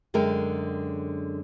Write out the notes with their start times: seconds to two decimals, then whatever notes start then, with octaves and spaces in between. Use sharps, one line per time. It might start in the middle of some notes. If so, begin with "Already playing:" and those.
0.14 F#2 D3 G#3 A#4 G5